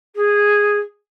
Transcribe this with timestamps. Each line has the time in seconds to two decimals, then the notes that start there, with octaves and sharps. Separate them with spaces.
0.15 G#4